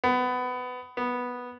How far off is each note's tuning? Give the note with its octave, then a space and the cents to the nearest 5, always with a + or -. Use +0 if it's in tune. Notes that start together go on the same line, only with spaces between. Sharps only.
B3 +20
B3 -5